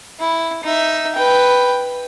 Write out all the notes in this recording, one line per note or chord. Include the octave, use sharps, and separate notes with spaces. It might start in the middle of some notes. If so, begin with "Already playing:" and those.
E4
D#4 E5
B4 G5